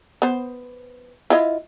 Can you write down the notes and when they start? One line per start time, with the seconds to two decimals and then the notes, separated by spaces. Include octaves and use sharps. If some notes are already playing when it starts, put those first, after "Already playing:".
0.22 B3 C5
1.30 E4 F4 D#5